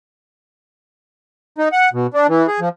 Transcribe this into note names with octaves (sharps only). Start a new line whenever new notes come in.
D#4
F#5
B2
D4
E3
G#4
F3